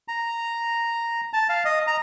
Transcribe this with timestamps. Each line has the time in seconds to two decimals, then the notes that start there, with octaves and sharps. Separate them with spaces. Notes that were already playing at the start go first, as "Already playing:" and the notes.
0.08 A#5
1.33 A5
1.49 F5
1.65 D#5
1.87 A#5